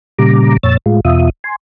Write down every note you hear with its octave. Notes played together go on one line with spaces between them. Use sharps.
A#2 C#3 G3 A#5 D6
F2 A#2 C#5 E6 A6
A2 G#3 F4
E2 B2 F4 E5 D#6
G#5 C6